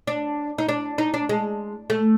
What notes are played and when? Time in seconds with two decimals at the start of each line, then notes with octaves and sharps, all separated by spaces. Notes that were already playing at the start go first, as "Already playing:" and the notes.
0.07 D4
0.58 D#4
0.69 D4
0.98 D#4
1.14 D4
1.29 G#3
1.90 A3